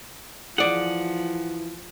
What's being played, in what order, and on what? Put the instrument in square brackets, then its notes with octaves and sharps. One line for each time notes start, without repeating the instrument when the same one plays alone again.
[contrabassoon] E3 [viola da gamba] F3 [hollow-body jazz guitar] G#4 D5 [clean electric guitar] F#5